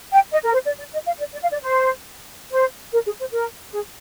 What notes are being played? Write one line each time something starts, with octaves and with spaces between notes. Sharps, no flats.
G5
D#5
A#4
C5
D5
D5
D#5
F5
D5
D5
F5
D5
C5
C5
A#4
G#4
C5
A#4
G#4